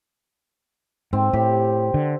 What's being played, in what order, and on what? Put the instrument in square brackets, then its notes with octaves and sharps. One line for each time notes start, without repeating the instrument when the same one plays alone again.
[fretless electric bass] G#2 [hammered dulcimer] C4
[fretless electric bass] A2 [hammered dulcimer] G4
[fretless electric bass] D3